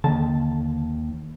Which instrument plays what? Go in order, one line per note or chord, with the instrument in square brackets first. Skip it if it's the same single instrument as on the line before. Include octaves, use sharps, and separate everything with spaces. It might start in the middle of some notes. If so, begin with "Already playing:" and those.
[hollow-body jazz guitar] D#2 A5 [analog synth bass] D3